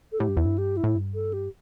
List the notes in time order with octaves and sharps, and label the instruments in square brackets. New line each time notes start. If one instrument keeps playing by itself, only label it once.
[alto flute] A4
[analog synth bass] A2 [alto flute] G4
[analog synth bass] G2
[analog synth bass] E2 [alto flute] E4
[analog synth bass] G2
[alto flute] G4
E4
[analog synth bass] A2
G2
[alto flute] A4
G4